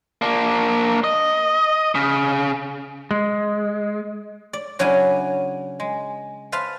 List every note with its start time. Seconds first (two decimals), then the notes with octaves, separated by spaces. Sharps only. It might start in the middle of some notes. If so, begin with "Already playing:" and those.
0.22 A#3 D4
1.04 D#5
1.95 C#3
3.11 G#3
4.53 D5
4.79 C#3 F#3 C#4 D4 E4 G#5
5.80 G#3
6.52 B4 C5 E5 F5 A5